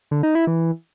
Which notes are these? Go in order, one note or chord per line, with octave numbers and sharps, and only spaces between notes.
D3
D#4
E4
E3